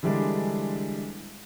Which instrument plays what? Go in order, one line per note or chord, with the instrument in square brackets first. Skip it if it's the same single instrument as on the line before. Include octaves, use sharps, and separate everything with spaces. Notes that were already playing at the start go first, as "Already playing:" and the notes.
[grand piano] D3 E3 G3 G#3 D4